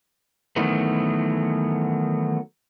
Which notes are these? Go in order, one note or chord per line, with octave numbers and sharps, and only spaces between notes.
D#3 E3 F#3 A3 B3